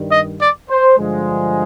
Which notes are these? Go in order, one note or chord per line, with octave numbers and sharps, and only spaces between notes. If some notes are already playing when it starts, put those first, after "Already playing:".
Already playing: G2 D#3 G3
D#5
D5
C5
G2 D3 F3 G#3